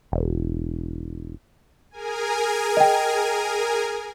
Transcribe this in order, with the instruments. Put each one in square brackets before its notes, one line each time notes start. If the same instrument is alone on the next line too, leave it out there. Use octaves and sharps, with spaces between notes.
[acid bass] E1
[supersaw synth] G#4 A#4 G#5
[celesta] D#5 G5